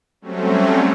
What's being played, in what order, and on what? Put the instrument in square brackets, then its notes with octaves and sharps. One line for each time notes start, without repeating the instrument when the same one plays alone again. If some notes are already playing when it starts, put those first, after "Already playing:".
[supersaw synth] F#3 G3 A3 C4 C#4